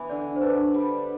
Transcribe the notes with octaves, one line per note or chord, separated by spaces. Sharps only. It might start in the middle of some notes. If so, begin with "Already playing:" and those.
Already playing: E3 B3
D3 D5
C5
D4 B4
G3